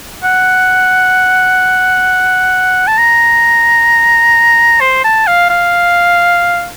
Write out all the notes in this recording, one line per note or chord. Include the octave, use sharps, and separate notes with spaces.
F#5
A5
A#5
C5
A5
F5
F5